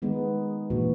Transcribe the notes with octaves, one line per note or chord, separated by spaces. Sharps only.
D#3 G#3 B3 D#4
A#2 E3 F#4